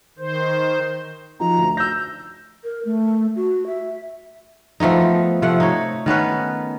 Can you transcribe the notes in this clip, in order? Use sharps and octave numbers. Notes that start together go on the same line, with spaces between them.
D#3 C5
F3 D#4 A#5
D2
E6 G6 A#6
A#4
A3
F#4
E5
F3 A3 B3 D#4
C3 F3 A3 F#5
D#4 C#5
D#3 B3 C#4 B4